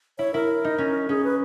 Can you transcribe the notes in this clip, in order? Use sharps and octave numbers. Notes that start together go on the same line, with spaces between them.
E4 C#5
E4 A#4
D#4
C#4
C#4 G#4
B4